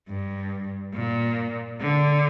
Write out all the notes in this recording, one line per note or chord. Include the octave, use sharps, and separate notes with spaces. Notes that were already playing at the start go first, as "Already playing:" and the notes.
G2
A#2
D3